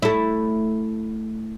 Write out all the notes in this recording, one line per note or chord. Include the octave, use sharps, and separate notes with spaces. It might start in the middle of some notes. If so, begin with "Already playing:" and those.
A3 E4